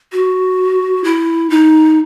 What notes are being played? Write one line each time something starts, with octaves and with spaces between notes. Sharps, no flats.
F#4
E4
D#4